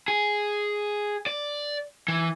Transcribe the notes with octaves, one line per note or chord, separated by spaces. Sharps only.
G#4
D5
E3